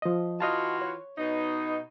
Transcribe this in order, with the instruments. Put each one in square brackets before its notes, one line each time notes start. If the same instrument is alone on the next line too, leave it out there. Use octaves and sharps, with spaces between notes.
[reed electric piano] F3 D#5
[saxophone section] E3 F4 F#4 [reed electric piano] D#5 F5 A5
[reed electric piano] C#5
[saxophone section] B2 D#4